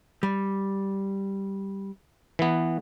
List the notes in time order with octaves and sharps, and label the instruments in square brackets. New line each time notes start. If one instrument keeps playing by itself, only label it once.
[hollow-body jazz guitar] G3
[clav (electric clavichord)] E3 B3